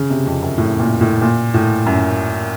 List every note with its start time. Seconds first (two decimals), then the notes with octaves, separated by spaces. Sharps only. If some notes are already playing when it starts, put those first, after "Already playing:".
Already playing: C#3
0.10 C3
0.26 F2
0.42 F#2
0.58 A2
0.79 A#2
1.01 A2
1.21 A#2
1.54 A2
1.86 F#2